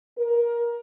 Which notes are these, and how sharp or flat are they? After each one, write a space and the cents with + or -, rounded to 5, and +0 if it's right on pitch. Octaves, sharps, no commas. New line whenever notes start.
A#4 +20